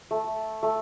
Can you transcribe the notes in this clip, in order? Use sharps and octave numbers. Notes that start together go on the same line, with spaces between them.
A3
A3